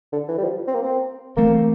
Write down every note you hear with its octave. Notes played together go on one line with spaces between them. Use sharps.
D3
E3
G3
F3
C4
A#3
C4
E3 A3 A#3 C4